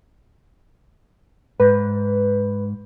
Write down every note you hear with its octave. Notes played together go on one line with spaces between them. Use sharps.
G#2 B4